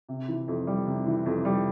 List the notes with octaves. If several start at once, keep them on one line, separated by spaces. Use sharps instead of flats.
C3
E3
F2
G3
C3
E3
F2
G3